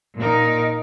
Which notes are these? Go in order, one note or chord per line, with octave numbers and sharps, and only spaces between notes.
A#2 D#4 A#4